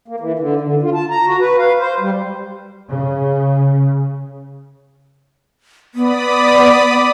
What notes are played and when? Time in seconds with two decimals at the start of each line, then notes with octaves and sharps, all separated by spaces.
0.08 A#3
0.20 E3
0.39 D3
0.61 D3
0.83 F4
0.94 A5
1.10 A#5
1.27 F#4
1.40 B4
1.58 F5
1.80 C5
2.00 G3
2.89 C#3
5.95 B3 D5 B5 D#6